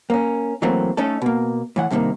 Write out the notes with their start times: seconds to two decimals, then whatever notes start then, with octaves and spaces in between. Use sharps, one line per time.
0.10 A#3 C#4
0.62 E3 F#3 A3 A#3 C4
0.97 A3 C#4 D#4 A4
1.22 B2 A#3
1.76 A2 E3 F#5
1.91 G2 C3 D#3 A3 A#3